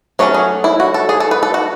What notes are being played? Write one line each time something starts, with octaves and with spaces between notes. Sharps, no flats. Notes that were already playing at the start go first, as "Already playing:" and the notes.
F#3 A3 C#4 C#5
G#4
E4
F#4
A4
G#4
A4
B4
A4
F#4